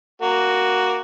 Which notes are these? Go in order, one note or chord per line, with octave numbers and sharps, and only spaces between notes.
A#3 F#4